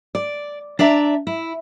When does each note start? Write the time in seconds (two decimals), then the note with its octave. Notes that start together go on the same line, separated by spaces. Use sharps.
0.15 D5
0.79 D4 D5 E5 A#5
1.27 E4